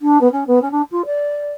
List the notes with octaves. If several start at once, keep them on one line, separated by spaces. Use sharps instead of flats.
D4
B3
C#4
B3
C#4
D4
F4
D5